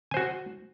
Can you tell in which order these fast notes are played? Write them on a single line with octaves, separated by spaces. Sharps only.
G#5 C5 F#4